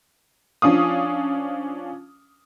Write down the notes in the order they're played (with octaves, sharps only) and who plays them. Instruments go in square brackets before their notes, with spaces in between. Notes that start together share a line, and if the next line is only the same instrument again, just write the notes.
[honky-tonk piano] F3 C#4 D4 F5 D#6